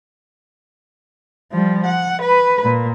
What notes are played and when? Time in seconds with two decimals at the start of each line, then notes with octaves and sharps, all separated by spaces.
1.52 F3 G3
1.86 F#5
2.22 B4
2.63 A#2